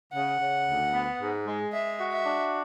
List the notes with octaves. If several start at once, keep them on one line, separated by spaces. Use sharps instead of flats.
C#3 F#5
C#3
D2
B3
G#2
G#3
G#3 E5
F#4
E5
D4